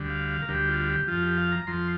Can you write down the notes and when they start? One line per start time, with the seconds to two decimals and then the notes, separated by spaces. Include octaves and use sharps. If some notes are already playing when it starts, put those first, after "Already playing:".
Already playing: D2 D3 G3
0.09 F5
0.29 F5
0.42 A#4
0.48 D2 D3 G3 G4
0.68 F4
0.89 G4
1.07 F2 F3 F4
1.22 G4
1.37 F5
1.52 A#5
1.67 F2 F3 C6